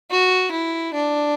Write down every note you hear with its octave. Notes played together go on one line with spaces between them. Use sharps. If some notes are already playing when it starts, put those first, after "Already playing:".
F#4
E4
D4